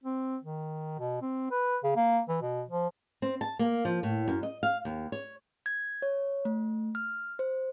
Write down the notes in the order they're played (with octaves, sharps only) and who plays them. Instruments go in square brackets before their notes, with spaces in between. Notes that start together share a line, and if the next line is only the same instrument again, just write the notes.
[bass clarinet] C4
D#3
B2
C4
B4
C#3
A#3
E3
B2
F3
[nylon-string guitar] C4
A5
A#3
F3
A2
F#2
D#5
F5
D#2
C#5
[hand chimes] G#6
C#5
A3
F6
C5